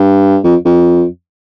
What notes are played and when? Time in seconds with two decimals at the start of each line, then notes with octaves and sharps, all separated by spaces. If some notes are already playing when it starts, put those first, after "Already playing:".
Already playing: G2
0.44 F2
0.65 F2